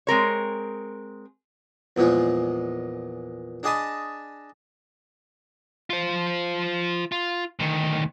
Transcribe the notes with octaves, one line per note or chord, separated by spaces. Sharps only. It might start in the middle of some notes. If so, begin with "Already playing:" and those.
G#3 C4 A#4 C#5
E2 A#2 F3 G#3
D4 G#4 D#5 G#5 A5 B5
F4 C5
F4
D2 D#3